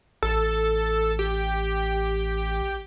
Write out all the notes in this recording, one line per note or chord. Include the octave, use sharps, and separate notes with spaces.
A1 A4
G4